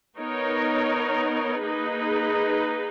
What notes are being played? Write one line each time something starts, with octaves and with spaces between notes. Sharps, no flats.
B3 D#4 A#4 C#5
A#3 D#4 G#4 B4